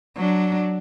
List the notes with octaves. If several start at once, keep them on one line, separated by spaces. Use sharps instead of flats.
F#3 D4